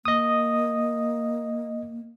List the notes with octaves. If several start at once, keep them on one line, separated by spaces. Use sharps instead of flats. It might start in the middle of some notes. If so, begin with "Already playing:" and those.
A#3 D#5 D#6